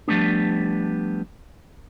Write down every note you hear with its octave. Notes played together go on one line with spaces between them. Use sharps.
F3 G3 A3 B3 D4